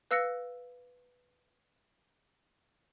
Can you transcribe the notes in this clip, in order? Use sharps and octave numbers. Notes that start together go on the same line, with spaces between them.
B4 F5 E6 F#6 A#6 C#7